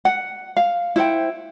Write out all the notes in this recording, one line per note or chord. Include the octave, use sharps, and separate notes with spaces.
F#5
F5
E4 C5 F#5 G5